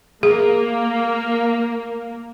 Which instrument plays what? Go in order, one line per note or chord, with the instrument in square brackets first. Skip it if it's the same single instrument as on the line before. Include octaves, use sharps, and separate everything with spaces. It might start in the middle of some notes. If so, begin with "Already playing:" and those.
[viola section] A#3 [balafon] G#4